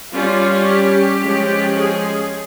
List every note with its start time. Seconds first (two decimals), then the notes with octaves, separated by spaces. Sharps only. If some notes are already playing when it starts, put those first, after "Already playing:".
0.12 G3 C#4 F4
0.65 G4
1.20 F3 G#3 C#4
1.74 G#4